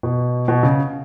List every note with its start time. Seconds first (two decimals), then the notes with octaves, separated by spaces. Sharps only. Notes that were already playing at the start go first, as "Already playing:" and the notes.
0.03 B2
0.48 B2
0.63 C#3